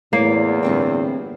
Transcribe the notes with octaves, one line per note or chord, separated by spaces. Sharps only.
E2 A2 A#3 C#5 D5
G1 A2 C4 G5